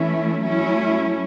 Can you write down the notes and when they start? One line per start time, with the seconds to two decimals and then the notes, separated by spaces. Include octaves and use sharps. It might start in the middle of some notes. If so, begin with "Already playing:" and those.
Already playing: E3 A3 C#4 E4
0.42 F#3 A3 C#4 E4